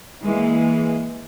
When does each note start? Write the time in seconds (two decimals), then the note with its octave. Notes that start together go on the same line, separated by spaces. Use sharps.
0.21 E3 G#3 A#3